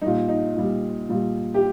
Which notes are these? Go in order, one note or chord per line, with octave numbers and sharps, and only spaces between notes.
A#2 G3 D#4
D#4
A#2 G3
A#2 G3
G4